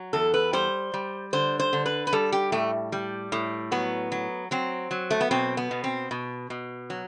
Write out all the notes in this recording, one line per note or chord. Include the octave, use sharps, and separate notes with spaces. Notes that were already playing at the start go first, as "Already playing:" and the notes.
Already playing: F#3
E2 A4
B4
G3 C5
G3
D3 C5
C5
D3
B4
B4
G3 A4
G4
A2 A3
G3
A2
F#3 B3
F#3
F#3 C4
F#3
A3
B3
B2 C4
B3
B2
C4
B2
B2
F#3